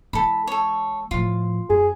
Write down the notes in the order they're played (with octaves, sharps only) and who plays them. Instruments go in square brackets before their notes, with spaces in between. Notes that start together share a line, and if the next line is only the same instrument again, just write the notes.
[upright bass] E3 G#3 [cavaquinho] A4 B5
[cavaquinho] A4 C#5
[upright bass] A2 F3 [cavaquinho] F4
[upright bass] F#2 [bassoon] G#4